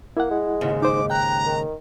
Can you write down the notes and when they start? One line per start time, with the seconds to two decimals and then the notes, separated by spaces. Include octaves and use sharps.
0.17 A#3 E4 F#5
0.31 G#3
0.61 D#2 G#2 C#3
0.82 D#4 C5 D6
1.10 G5 A#5 F#6
1.46 D#3